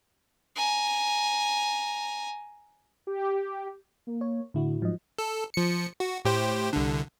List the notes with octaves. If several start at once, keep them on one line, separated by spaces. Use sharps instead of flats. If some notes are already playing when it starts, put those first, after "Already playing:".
G#5 A#5
G4
A#3
C#5
A2 D3 E4 F#4
G#2 F3 F#3 D#5
A4
F3 C#7
F#4
A2 G4 C5
C2 D3